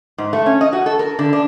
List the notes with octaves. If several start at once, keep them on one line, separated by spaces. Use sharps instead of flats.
G#2
A3
C#4
D#5
F#4
A4
A#4
D3
D4